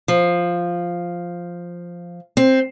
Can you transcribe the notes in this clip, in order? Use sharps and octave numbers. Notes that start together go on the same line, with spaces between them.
F3
C4